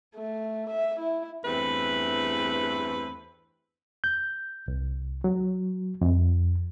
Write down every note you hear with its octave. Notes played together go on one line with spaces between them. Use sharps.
A3
E5
E4
E2 G2 A3 C4 B4
G6
C2
F#3
F2